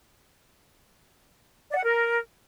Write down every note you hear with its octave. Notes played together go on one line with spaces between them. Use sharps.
D5
F#5
A#4